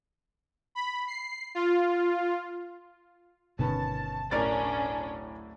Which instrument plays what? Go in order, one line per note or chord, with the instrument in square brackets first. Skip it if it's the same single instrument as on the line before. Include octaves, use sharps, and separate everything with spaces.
[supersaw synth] B5
C7
F4
[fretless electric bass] G1 B2 D3 [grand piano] D#3 B3 C#4 [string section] A5
[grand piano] D1 A2 [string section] C#4 D4 [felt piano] A#4 D5 A6